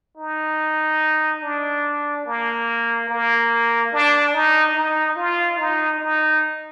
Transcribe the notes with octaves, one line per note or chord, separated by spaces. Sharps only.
D#4
D4
A#3
A#3
D4
D#4
D#4
F4
D#4
D#4